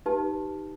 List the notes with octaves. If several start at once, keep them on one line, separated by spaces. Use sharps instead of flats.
D#4 G4 B4 A5